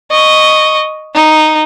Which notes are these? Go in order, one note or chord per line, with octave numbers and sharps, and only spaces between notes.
D#5 C#6
D#4